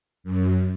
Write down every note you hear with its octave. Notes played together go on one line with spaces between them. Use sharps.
F#2